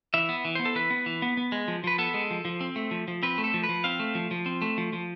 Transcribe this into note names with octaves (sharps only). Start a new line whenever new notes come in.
E3 E5
B3
E3
B3 C5
A4
E3 B4
B3
E3
B3
B3
G#3
F3
F3 B4
B3 A4
G#3
F3
F3
C4
A3
F3
F3
C4 B4
A3
A4
F3
B4
F3
C4 F5
A3
F3
F3
C4
A3
F3
F3